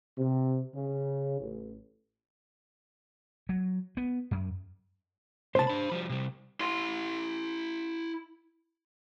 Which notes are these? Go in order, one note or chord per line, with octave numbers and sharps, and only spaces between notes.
C3
C#3
A1
F#3
B3
F#2
C#2 C3 C5 A5
D4 B5
F3 G3
C3 G3
E4 C6